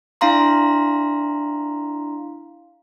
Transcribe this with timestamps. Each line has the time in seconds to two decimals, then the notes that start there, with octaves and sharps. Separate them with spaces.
0.21 D4 E4 F5 A#5 C6